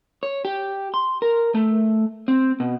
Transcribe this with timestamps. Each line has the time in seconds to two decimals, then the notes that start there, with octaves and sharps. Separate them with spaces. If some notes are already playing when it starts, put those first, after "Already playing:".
0.23 C#5
0.45 G4
0.94 C6
1.22 A#4
1.55 A3
2.28 C4
2.60 B2